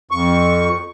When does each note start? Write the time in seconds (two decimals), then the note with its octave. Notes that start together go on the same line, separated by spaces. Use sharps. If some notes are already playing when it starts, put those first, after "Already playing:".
0.11 F2 C#6